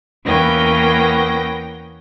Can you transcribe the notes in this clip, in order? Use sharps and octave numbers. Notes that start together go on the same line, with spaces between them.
E2 A#3 B3 C#4 G5 A#6